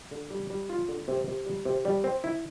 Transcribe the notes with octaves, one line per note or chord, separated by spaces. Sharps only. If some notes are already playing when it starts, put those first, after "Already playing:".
D3
G3
G3
F4
D3
C3
C3
G3
C3
G3
C4
E4